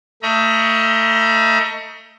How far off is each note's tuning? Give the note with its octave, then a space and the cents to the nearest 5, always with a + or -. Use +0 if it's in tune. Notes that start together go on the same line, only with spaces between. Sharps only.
A3 +30 D#5 +30 A#5 +45